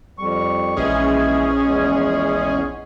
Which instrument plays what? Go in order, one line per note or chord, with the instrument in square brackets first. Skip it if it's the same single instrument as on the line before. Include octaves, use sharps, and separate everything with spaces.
[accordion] F2 G3 C#6
[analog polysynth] A#1 C#4 G#4 [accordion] E3 G#3
[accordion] E2 G#3